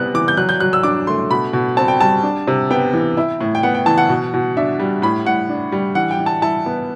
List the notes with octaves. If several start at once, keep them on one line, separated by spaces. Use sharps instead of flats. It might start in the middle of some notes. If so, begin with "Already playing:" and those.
Already playing: C3 B3 F#6
E3 D6
G6
F#3 F#6
G6
F#3 F#6
E6
D4 D6
A3 C6
B2 B5
B2
C4 A5
G5
G3 A5
D4
C3
B3 G5
E3
E4
A2
G5
B3 F#5
G5
E3 A5
F#5
B2
B2
D4 E5
G3
A2 B5
A2 F#5
D4
G3
E3 F#5
G5
E3
A5
E4 A5
B3